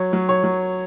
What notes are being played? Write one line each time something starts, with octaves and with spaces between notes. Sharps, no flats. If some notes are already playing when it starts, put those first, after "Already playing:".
Already playing: F#3 C#5
F#3
C#5
F#3